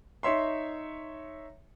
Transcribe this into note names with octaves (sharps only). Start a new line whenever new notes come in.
D#4 C#5 E5 C6